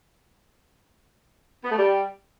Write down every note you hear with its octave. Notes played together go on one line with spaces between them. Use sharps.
B3
A3
G3